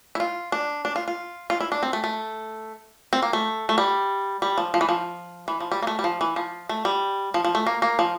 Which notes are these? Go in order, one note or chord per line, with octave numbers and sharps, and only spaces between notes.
E4
F4
D4
D4
F4
F4
F4
E4
D4
C4
A3
A3
C4
A#3
A3
A3
G3
G3
F3
F3
E3
F3
E3
F3
G3
A#3
A3
G3
F3
E3
F3
A3
G3
F3
F3
A3
A#3
A#3
F3